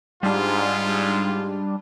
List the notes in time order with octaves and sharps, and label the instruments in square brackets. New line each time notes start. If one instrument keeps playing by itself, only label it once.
[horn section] G#2 [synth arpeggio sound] G3 D4 [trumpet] F4